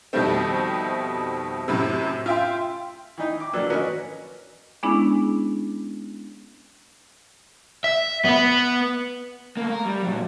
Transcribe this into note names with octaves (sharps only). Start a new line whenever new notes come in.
F2 B2 D#3 G3 A3 C4
F#2 A2 C3
F4 E5 G5 C6
E3 D#4 G5
D6
F#3 A#3 D4 A4 B4
C#4 F#4 A#4 B4 C#5 D#5
G#3 B3 C#4 D4 E4 G#4
E5
B3 B4
A3 A#3
A#4
G3
A#2 F#3